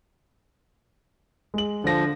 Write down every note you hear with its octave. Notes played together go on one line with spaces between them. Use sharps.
G#3 F#7
D3 F3 A#6